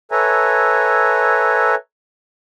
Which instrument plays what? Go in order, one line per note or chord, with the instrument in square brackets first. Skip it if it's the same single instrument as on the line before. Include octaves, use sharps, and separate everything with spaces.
[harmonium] A4 B4 C#5 E5 G#5 A#5